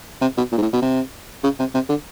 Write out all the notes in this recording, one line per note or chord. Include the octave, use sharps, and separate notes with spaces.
C3
B2
A#2
G#2
A2
B2
C3
C#3
C3
C3
D3